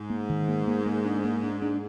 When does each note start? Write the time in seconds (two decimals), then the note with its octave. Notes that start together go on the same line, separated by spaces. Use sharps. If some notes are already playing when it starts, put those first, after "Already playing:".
Already playing: G#2
0.10 A#3
0.29 D#3
0.48 A#3
0.68 A#3
0.86 A#3
1.05 D4
1.24 A#3
1.43 D4
1.62 D4